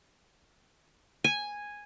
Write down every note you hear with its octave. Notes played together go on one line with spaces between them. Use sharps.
G#5